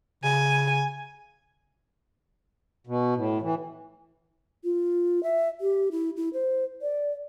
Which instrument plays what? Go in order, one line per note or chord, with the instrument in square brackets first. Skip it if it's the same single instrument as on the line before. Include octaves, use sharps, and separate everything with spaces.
[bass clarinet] C#3 [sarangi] G#5
[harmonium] B2
A2
E3
[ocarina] F4
E5
G4
E4
E4
C5
D5